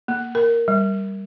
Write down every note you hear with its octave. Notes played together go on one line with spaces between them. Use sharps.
A#3
A#4
G3